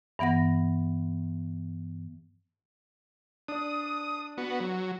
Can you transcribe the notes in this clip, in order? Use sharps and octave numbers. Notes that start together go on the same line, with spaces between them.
G2 E3 B3 F#5 A#6
D4 D5 D#6
B3 F#4
F#3